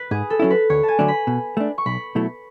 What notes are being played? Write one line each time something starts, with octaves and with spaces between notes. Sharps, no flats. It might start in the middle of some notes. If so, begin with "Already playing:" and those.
Already playing: B4
G#2 G#4
A4
F#3 C#4 E4
B4
D2 C#5
G#5 A5
D3 F#3 A3 D4
B5
B2
A3 D4
C#6
B1 B5
B2 F#3 A3 E4